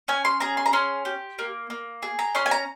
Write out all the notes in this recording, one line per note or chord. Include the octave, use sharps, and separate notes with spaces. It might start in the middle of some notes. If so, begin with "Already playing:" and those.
C#4 G#5
C6
G#4 A#5
C6
A#5
C#4 C6
G4
A#3
A#3
G#4
A#5
C#4 C6
G#5
A#5